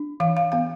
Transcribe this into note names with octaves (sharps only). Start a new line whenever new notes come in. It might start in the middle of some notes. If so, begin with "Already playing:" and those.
Already playing: D4
E3 F5
F5
B3 F5